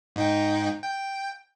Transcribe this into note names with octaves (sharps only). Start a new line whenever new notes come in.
G#2 D#4 G5
G5